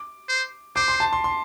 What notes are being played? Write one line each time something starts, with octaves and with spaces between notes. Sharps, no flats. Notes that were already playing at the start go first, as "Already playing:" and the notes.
Already playing: D6
C5
C5 D6
C6
A5
C6
C6